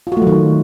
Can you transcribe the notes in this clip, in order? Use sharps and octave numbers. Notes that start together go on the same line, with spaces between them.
F4
F#4
A3
F#3
D#3